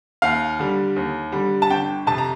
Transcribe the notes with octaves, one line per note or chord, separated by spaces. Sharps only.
D#2 F5
D3 G3
D#2
D3 G3
A5
G1 G5
F2 C3 A5
A#5